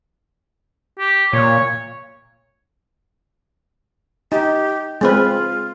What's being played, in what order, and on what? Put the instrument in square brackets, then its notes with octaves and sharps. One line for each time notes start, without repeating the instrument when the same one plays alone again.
[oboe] G4
[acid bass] A#2 [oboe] C#5
[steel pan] D#4 [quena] G4
[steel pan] G#3 C4 B4 [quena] F4